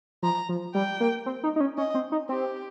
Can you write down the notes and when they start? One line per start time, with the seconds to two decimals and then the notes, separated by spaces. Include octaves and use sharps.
0.23 F3 A#5
0.49 F3
0.75 G3 G5
1.00 A#3
1.26 C4
1.44 D#4
1.56 D#4
1.60 C#4
1.78 C#4 D#5
1.94 C4
2.12 D#4
2.29 C4 G4